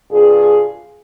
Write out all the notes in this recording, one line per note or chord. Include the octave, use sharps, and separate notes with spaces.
G2 C3 F4 G#4